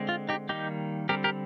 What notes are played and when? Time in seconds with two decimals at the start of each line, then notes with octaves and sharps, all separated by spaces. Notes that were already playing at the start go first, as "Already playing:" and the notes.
Already playing: D3 G#3 C4
0.09 F4
0.29 D#4 G4
0.49 D#3 G3 A#3 D#4 G4
1.09 D3 G3 C4 G4 A#4
1.24 G4 A#4